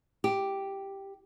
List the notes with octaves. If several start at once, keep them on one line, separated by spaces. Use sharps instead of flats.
G4